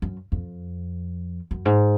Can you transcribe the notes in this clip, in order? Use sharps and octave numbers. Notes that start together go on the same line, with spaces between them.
F#2
F2
F#2
G#2